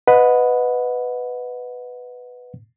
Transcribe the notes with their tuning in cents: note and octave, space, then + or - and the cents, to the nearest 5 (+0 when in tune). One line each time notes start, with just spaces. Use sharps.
B4 +5 D#5 +0 F#5 -20